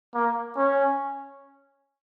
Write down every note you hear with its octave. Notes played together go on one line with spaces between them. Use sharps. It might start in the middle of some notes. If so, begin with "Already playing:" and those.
A#3
C#4